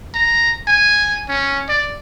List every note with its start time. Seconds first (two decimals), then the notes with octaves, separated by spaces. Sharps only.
0.14 A#5
0.67 G#5
1.29 C#4
1.69 D5